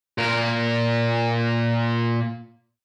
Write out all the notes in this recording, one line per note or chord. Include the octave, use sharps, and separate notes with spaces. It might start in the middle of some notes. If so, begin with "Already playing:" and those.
A#2 A#4